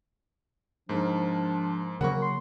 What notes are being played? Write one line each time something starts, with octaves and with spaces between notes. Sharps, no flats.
G#2 F3 A#3 D4
C#3 F#3 A#3 A#4 F#5 B5 C#6
C6